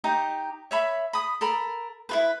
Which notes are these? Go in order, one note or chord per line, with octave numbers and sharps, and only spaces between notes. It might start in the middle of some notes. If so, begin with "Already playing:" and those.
D#4 G4 A#5
C#5 E5 B5
B5 D#6
A4 A#4 B5
E4 F4 B4